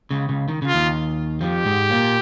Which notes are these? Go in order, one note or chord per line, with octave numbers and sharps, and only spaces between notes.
C#2 C#3
C#2 C#3
D#3
C#3
F4
D#2 D#3
F2 F3 G4
G#2 G#3
A#2 A#3